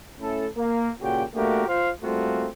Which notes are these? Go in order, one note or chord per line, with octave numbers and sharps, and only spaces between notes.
A3 C#4 E4 A4
A#3
A#2 C#3 F#4 G4 G5
A3 A#3 D4 F#4 G4 A#4
F4 C5 F5
G3 A3 A#3 C4 F4 F#4